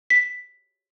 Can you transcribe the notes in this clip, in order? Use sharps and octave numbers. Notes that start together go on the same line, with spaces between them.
B6